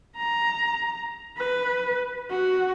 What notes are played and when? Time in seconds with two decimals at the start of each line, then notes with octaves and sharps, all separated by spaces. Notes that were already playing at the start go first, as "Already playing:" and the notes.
0.17 A#5
1.38 B4
2.30 F#4